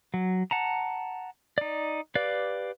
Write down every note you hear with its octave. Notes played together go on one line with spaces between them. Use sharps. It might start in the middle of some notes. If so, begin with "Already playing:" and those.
F#3
F#5 A5 A#5
D#4 D5
G4 B4 D5 F5